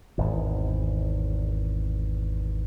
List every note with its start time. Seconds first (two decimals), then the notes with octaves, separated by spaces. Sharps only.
0.18 G#1 E2